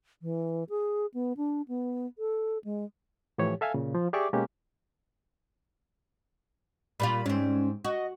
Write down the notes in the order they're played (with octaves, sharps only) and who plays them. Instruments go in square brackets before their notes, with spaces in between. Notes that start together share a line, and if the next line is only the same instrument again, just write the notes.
[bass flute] E3
G#4
B3
D4
B3
A4
G#3
[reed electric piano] A2 E3 F3 G4 C#5
A4 E5 F5 G#5
A#2 C#3
F3
G4 G#4 D5 E5 C#6 D6
B2 G#3 A#3 C#4 G4
[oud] A#2 G3 F4 [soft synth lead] B5
[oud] G#2 C4 [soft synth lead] C#4
[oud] F#4 [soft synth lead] D#5